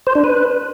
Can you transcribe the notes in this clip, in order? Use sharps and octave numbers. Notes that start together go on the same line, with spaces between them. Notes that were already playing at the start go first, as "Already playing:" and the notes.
C5
D4
B4